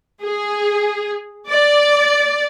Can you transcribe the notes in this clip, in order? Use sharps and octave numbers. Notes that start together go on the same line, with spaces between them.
G#4
D5